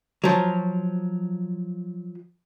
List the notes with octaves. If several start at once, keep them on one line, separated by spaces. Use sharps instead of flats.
F3 F#3